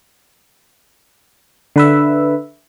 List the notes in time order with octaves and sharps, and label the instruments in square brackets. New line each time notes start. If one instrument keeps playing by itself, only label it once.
[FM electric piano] D3 B4 E5